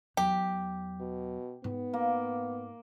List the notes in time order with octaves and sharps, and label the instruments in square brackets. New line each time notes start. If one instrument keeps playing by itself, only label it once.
[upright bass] E2 F#3 [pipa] G4
[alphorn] B2
[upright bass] G#2 [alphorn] B3
[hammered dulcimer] A#3